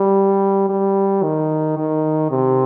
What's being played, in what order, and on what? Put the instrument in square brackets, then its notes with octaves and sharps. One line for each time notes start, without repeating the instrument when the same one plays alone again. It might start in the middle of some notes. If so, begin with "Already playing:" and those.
Already playing: [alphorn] G3
G3
D#3
D#3
C3